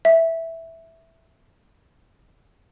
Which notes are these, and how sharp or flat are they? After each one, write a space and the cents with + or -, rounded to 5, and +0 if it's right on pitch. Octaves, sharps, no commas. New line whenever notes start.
E5 -5